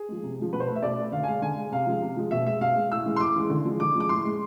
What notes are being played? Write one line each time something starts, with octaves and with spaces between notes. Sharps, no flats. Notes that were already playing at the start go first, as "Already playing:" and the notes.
Already playing: G#4
F3 G#3
C3
F3 G#3
B2 B4
C5
A3 B4
E5
B2 D5
A3
D3 F5
G#5
G#3 F5
D3 G#5
G#3
C3 F5
F3 G#3
C3
F3 G#3
B2 E5
G#3 E5
B2 F5
G#3
A2 E6
E3 G#3
C6
A2 D6
E3 G#3
D3
F3 G#3
D3 D6
F3 G#3 D6
A2 C6
G#3